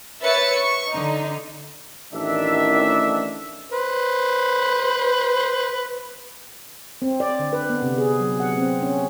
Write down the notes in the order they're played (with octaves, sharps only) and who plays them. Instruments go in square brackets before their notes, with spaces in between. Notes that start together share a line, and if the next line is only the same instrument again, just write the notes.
[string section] B4 C#5 E5 A6 C#7
C#6
D3 D#4
[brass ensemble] A1 D#3 D4 E5
[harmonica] B4 C5
[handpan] C4
D5
D3
B4
B3
C3
G#4
F#3
F#5
C4
C#4